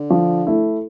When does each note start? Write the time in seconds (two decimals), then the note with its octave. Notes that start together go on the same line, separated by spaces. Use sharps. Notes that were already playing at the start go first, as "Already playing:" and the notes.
Already playing: D3
0.10 F3
0.47 A3 E4